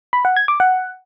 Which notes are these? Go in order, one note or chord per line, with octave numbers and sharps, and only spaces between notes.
B5
F#5
G#6
D6
F#5